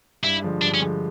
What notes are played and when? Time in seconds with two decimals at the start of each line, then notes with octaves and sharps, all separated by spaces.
0.24 G2 E4
0.42 D3 F3 G#3
0.61 G2 D4
0.74 C#4
0.80 D3 F3 G#3